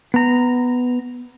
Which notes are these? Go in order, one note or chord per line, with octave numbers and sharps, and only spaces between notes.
B3 A#5